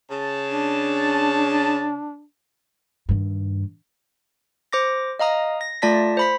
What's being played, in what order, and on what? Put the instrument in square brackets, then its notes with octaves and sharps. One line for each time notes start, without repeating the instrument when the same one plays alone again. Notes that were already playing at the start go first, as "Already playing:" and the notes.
[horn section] C#3 A5
[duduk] D4
[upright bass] G2 D#3
[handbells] C5 D6 A#6
D#5 F5 A#5 D#6
A#6
A3 F4 D5 A5 A#6 B6
C5 B5 B6